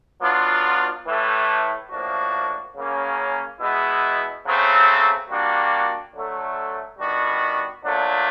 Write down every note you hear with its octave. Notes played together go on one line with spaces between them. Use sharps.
F#3 B3 D4 F4
A2 E3 A3
A2 F3 A#3 D4 F#4
C#3 F#3 A#3 C#4
B2 G#3 B3 E4
C#3 F#3 A3 C4
G3 A#3 D4 F#4
D3 F#3 A3
D#3 G3 B3 D4 F#4
A#2 F#3 A3 D4